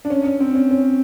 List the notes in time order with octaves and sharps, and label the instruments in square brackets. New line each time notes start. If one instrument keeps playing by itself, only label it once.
[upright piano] D4
C#4
C#4
C4
C#4
C#4